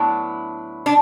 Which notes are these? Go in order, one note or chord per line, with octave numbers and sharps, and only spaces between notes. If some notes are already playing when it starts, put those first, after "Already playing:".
Already playing: A2 F#3 B3 D4 E4
D4